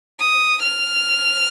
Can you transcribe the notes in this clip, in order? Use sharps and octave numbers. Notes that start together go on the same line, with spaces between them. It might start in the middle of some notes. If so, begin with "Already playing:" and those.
D#6
F6